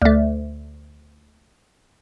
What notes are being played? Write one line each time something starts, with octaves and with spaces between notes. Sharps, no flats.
D2 A3